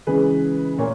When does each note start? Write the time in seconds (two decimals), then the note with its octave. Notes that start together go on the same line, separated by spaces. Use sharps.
0.07 C#3 E3 G#3 G#4 B4
0.78 A#2 A#4 C#5